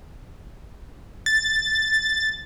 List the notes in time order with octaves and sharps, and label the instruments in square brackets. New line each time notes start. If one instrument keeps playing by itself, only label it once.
[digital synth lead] A6